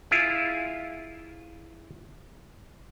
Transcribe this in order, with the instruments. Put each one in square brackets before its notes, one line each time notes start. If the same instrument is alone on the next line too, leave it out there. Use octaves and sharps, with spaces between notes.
[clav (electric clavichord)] E4 F4 G#4